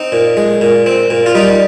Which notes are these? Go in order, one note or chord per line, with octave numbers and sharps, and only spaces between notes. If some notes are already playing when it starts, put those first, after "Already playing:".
Already playing: C4 D#4
A#2
G#3
A#2
C4
A#2
F4
G3 D#4